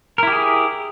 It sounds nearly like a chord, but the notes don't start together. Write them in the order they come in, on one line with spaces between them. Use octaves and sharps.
A#4 E4 G4 G#4